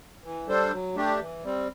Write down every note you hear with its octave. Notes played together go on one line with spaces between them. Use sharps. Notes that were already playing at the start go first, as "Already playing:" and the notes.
E3
G3 D4 A4 C5
F#3
A3 D4 G4
E3
G3 C4